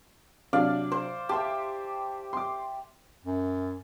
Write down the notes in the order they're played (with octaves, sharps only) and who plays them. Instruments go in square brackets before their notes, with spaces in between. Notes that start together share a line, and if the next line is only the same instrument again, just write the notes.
[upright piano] C3 F#3 D4 [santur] D5 F5
[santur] C5
[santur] G4 E5 [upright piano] A5 C6
[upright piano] C6 D6
[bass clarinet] F#2